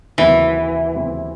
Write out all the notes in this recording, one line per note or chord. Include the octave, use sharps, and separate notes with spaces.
D#2 C#3 E3 F#3 C4
D#2 C#3 F#3 C4